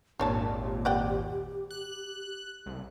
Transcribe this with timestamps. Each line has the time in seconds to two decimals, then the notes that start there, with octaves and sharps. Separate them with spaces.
0.19 G#1 D#2 A#2 D4 G4 C#5 A5
0.85 D5 F#5 G5
1.71 F#6
2.66 C2